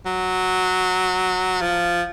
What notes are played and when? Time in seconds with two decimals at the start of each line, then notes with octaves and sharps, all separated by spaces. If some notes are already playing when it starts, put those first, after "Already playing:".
0.06 F#3
1.61 F3